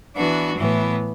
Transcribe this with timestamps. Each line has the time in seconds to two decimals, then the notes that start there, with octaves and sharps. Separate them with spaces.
0.17 E3 B3 D4 F#4
0.58 A2 E3 B3